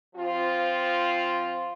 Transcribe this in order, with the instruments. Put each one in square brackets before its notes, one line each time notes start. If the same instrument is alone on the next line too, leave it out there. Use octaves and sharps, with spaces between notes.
[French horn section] F3 C4 F4